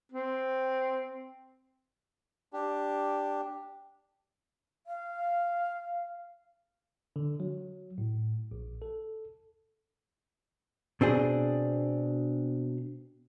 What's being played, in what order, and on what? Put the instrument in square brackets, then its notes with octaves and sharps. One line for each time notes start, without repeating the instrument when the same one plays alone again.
[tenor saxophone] C4
[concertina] D4 G4
[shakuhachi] F5
[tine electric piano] D3
F#3
A2
A#1
A4
[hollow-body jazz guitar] B2 C4 D4 G#4